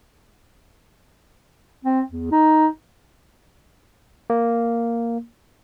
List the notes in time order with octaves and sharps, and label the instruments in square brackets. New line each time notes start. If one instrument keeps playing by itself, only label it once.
[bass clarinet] C4
E2
D#4
[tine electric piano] A#3